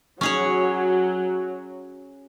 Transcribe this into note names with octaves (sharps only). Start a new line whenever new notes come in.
F#3 C#4 G#4 C#5